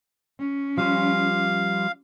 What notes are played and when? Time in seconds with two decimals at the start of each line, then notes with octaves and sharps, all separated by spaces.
0.39 C#4
0.78 F3 G3 F4 F5